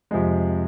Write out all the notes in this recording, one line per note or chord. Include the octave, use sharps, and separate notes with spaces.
F2 C3 F3 G#3